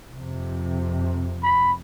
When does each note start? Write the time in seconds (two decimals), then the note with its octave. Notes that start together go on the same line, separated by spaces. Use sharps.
0.14 F2 C3
1.43 B5